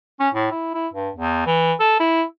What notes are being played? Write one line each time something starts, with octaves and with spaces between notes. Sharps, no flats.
C#4
A2
E4
E4
G2
E2
E3
A4
E4